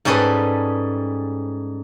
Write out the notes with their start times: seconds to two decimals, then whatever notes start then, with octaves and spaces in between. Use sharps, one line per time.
0.05 G#2 G3 C#4 G#4 A4 B4